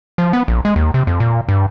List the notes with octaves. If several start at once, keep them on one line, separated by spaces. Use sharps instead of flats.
F3
B3
A#1
G#3
D#2
C3
F2
A#2
G2